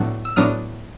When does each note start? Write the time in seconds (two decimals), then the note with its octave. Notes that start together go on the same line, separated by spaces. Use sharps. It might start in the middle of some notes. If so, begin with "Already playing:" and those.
Already playing: A2 F#3 B3 D4
0.25 E6
0.36 A2 F#3 B3 D4 D#6 F6